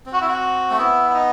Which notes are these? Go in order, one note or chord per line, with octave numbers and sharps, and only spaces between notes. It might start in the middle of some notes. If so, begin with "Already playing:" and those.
C4
F#4
E4
F#4
A3
B3 E4
E4
D#4